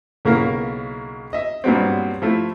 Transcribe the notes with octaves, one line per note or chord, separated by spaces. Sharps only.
B1 C#3 A#3 E4 A#4
D#5 E5
G2 A#2 F#3 B3 C4
F3 A3 E4